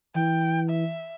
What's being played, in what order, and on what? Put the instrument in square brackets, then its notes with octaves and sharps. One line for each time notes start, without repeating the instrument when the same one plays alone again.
[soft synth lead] E3 [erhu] G5
[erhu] E5